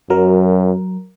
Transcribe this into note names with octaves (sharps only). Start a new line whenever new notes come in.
F#2 F#3 A#4